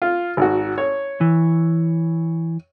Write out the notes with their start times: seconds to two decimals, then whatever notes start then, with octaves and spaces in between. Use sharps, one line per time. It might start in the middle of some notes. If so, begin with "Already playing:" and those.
0.02 F4
0.37 G#1 F#4
0.78 C#5
1.21 E3